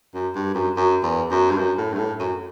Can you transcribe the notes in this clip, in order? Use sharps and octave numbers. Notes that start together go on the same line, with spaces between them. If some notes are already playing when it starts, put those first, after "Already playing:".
F#2
G2
F#2
F#2
E2
F#2
G2
F#2
A2
G2
A2
F#2